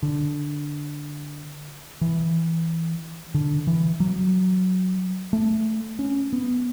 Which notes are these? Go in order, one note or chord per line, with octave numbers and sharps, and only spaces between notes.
D3
E3
D3
E3
F#3
A3
C#4
B3